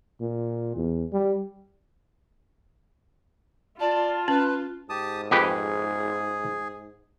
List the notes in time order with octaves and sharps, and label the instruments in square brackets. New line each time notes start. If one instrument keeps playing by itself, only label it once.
[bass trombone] A#2
E2
G3
[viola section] F4 [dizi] D5 [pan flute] A5
[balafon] C#4 [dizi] B4
[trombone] G#2 [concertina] G4 A5 D#6
[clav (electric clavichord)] F2 G4 B4 [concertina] G#4